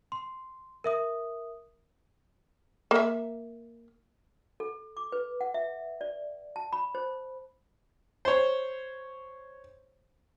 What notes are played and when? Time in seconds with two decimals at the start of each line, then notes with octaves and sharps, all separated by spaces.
0.12 C6
0.84 A#4 E5 D#6
2.91 A#3 E5
4.60 A4
4.97 D6
5.12 B4
5.41 F#5
5.54 E5
6.01 D5
6.56 A5
6.72 B5
6.95 C5
8.25 C5 C#5